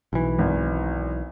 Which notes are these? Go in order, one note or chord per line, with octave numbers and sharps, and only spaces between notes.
B1 E3
G#1